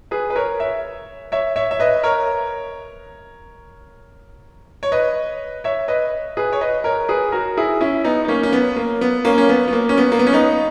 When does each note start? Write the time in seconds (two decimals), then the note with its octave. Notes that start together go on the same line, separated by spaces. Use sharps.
0.11 G#4 B4
0.30 B4
0.35 A#4 C#5
0.60 C#5 E5
1.32 C#5 E5
1.56 C#5 E5
1.71 E5
1.80 B4 D#5
2.03 A#4 C#5
4.83 C#5
4.92 B4 D#5
5.64 C#5 E5
5.88 B4 D#5
6.37 G#4 B4
6.53 C#5
6.61 B4 D#5
6.84 A#4 C#5
7.09 G#4 B4
7.32 F#4 A#4
7.57 E4 G#4
7.81 C#4 E4
8.04 B3 D#4
8.25 D#4
8.28 A#3 C#4
8.43 C#4
8.53 B3
8.76 A#3
9.01 B3
9.25 A#3 C#4
9.38 C#4
9.49 B3
9.68 B3
9.73 A#3
9.89 C#4
9.97 B3
10.12 A#3
10.19 B3
10.27 C#4
10.33 B3 D#4